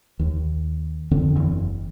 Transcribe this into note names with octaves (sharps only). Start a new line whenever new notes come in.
D#2
F2 D3 C4
F#1 E2